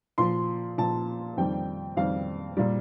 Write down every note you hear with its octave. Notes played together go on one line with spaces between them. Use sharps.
A#2 F3 C6
A#2 F3 A5
F2 D#3 G3 G5
F2 D#3 G3 F5
A#2 G3